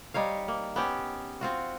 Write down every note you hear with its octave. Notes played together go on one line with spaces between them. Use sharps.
G3 D#4 C#5 F5
A#3
B3 C#4 G4
C4 F4 F#4